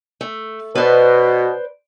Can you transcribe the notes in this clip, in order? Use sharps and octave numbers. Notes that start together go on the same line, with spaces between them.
A3
B2 B4 C5 D5